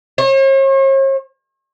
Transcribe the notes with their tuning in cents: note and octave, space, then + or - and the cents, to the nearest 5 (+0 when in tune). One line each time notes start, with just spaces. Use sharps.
C#5 -45